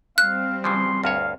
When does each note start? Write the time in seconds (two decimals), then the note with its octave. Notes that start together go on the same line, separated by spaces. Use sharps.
0.18 G3 C4 F5 F#6
0.64 C#3 E3 F3 C6
1.03 D2 G2 C#5 F5